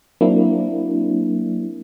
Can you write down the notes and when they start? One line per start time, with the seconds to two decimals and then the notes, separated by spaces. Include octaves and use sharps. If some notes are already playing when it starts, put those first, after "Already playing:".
0.21 F#3 A#3 C4 D4 E4